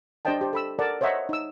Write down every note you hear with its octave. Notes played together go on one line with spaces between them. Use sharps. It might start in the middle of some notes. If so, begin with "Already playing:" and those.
D4 G4 C5 D#5 G5 A5
G4 C5
A4 B5 E6
A4 A#4 D5 F#5 A5
C5 C#5 D#5 E5 F#5 A#5
D#4 E6